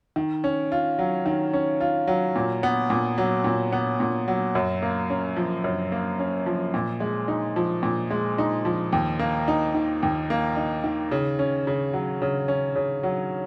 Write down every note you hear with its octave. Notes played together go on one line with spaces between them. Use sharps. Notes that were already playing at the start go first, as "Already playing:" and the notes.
D#3
C#4
F4
F#3
D#3
C#4
F4
F#3
A#2
B3
A#2
F#3
A#2
B3
A#2
F#3
F#2
A#3
C#4
F3
F#2
A#3
C#4
F3
A#2
G#3
D#4
F3
A#2
G#3
D#4
F3
D#2
A#3
D#4
D#3
D#2
A#3
D#4
D#3
C#3
C#4
C#3
F#3
C#3
C#4
C#3
F#3